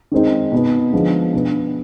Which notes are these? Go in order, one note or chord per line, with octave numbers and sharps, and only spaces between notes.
D#3 G#3 C4 D#4
B2 B3 D#4
D3 F3 G#3 B3
B2 B3 D4